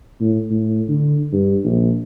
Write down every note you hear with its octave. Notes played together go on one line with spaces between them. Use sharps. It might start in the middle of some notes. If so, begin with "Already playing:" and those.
A2
A2
D3
G2
A#1